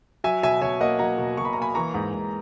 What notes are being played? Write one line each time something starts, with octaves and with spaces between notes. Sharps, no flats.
F#3 E5 G#5
B2 E5 G#5
B2 C#5 E5
A#3 D#5 F#5
F#3 F#5 A#5
B2
B2 C#6
B5
A#5
A#3
G#5 B5
E3 A#5 C#6
G#2
G#2